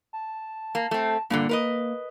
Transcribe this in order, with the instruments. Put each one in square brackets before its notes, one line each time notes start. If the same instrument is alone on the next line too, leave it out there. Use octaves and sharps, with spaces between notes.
[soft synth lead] A5
[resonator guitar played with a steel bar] A#3
A3 C4
[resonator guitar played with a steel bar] G2 A#2 D3 [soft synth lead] A#3
[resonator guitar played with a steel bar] A#4 B4 D#5